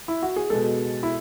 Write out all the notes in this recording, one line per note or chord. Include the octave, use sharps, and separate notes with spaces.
E4
F#4
G#4
B2 G#3 A4
E4